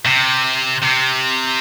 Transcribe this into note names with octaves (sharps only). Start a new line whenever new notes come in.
C3
C3